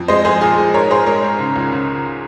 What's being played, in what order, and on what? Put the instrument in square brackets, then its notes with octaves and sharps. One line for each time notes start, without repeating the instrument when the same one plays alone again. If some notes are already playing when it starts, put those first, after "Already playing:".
Already playing: [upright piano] F2
G#3 C5 D#5
G#3 G#4 C5
A#2 G#4
G#3
G#2 A#4 C#5
G#2 G#4 C5
G#3 A#4 C#5
G#2
C#3
C#2
C#3